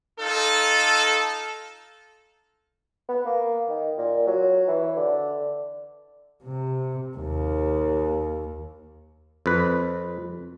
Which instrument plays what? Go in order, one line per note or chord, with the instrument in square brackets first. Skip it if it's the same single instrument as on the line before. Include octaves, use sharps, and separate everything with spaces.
[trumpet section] D#4 F4 A4
[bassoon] B3
A#3
D#3
A#2
F#3
E3
D3
[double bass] C3
D#2
[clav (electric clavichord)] F2 B4